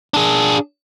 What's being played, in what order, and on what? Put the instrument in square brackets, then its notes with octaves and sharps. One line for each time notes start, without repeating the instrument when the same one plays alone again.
[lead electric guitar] D4 G#4